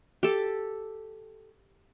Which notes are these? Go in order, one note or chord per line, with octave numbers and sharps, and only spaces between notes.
G4 A4